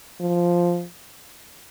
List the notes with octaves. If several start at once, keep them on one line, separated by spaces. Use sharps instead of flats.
F3